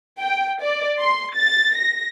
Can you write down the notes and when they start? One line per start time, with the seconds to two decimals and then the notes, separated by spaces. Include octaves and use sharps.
0.19 G5
0.62 D5
0.99 C6
1.35 A6
1.78 A#6